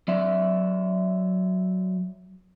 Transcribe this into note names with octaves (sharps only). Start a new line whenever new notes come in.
F#3 D5 E5